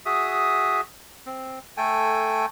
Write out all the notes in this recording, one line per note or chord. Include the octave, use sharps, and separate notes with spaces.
F#4 G#4 E5 D#6
C4
A3 A4 G5 G#5